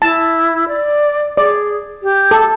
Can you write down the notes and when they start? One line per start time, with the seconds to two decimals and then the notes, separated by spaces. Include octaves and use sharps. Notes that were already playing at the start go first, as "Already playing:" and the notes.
0.02 E4 A5
0.68 D5
1.37 G#4 D5
2.02 G4
2.31 A4